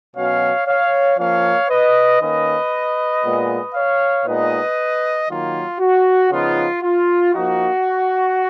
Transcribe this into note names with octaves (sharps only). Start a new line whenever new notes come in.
B2 F#3 C#4 C#5 F5
C#5 F5
F3 A#3 C#4 C#5 F5
B4 D#5
D#3 A#3 C#4 B4 D#5
A#2 G#3 B3
C#5 F5
A#2 G#3 B3 D#4 B4 D#5
D#3 F#3 A#3 F4
F#4
C#3 F3 B3 D#4 F4
F4
F3 A#3 D#4 F#4